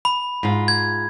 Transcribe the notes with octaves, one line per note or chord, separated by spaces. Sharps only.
B5
G#2 F4
G#6